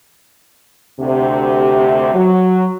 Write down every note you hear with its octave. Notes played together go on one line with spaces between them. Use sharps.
D2 C3
F#3